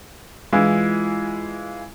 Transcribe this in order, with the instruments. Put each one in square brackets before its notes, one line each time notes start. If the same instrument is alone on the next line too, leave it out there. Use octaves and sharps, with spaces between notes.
[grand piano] E3 G#3 E4 F4